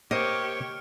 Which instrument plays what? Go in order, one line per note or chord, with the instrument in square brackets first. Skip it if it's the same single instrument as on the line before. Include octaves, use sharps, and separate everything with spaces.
[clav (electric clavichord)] A#3 C5 [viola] G4 C#5 [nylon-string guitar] D#5 [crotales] F6 C#7 D7